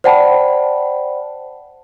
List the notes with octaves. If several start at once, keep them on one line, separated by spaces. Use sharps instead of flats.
C5 D5 F#5 G5 A5 B5